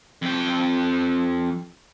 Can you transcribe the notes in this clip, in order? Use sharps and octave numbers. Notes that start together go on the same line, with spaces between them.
F2 G5